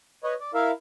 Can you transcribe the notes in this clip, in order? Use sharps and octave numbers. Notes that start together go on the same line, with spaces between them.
B4 C#5 D#5
D5
E4 A#4 E5 F5